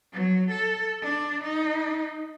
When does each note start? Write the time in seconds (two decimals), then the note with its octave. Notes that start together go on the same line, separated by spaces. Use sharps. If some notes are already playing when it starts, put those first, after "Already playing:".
0.13 F#3
0.51 A4
1.02 D4
1.44 D#4